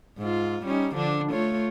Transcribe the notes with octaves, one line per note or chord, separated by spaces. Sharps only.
G#2 F4
G3 C#4 D#4
D3 F3 D4
A3 F4 C#5